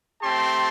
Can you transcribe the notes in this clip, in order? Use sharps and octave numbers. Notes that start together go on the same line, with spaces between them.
A3 C4 G4 A5 C6